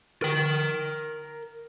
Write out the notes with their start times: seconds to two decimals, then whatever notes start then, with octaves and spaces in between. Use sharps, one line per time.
0.22 A#4 G5